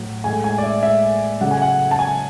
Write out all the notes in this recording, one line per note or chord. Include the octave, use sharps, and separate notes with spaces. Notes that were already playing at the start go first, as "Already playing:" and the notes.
Already playing: A2 F#3
A2 G#3 G#5
G#5
D5
E5
E5
C#3 F#3 A3 F#5
G#5
F#5
A5
G#5